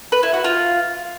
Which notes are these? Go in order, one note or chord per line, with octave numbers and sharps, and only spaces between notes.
B4
E4
F#4
F4